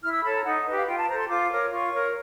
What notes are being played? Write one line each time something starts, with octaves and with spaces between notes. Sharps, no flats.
E4 F6
E6
A4 C#5 B5
A#5
D#4 F#5
B4 D#5
G4
F5
F4 G5
A5
A4 C5 A#5
C6
F4 D6
A#4 C#5
F4 C#6
A#4 C#5